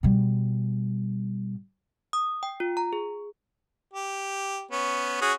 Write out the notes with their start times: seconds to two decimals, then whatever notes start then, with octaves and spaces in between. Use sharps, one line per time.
0.03 B2 G3
2.13 D#6
2.43 G5
2.60 F4
2.77 A#5
2.93 G#4
3.93 G4
4.71 B3 C#4
5.21 C#4 F#4 G#4